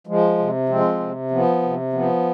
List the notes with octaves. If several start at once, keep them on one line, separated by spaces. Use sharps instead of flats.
F3 G#3
C3
F3 G#3 C4
C3
F3 B3
C3
F3 B3